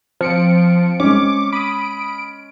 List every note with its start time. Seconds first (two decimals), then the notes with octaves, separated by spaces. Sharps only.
0.21 F3 C4 C#7 D7
1.00 G#3 C#4 D6
1.53 B5 D#6 D7